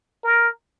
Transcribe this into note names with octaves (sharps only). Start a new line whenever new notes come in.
A#4